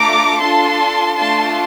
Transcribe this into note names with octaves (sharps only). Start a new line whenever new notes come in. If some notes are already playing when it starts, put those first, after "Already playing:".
Already playing: A3 D4 F4 A4 A#5 D6
D4 F4 A4 A5 C6
A3 D4 F4 A5 C6